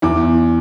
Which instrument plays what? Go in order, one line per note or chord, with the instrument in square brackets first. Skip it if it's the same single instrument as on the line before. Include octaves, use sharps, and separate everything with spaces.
[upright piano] E2 D6